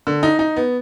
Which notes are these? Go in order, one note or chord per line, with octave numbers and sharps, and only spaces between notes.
D3
D#4
D#4
B3